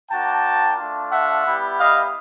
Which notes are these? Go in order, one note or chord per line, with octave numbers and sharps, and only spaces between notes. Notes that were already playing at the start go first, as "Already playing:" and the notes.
A#3 D4 F#4 G5 A5
A3 D4 F4
E5 F#5
G3 B3 E4 G4
D#5 F5